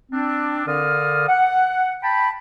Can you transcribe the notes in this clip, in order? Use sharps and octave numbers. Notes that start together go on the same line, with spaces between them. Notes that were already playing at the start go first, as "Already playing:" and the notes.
C4 D4
D3 A#4 D5 F5 D#6 F6
F#5
G5 A5 B5